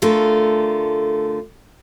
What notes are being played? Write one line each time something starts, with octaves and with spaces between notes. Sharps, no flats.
D3 A3 F4 A#4